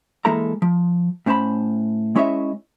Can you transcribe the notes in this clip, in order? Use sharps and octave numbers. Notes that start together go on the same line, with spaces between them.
E3 G#3 A#3 E4 A4 A#5
F3
A2 C#4 C5 A5 B5
G#3 C#4 E4 C#5 D#5 E5